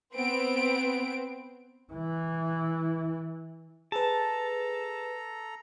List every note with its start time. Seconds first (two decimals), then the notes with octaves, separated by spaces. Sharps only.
0.13 B3 C4 D7
1.93 E3 E4
3.92 G#4 A4 B4 A5 A#5